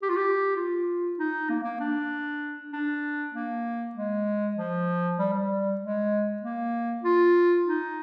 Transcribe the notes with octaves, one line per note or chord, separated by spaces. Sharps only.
G4
F4
G4
F4
D#4
A#3
A#3
D4
D4
A#3
G#3
F3
G3
G3
G#3
A#3
F4
D#4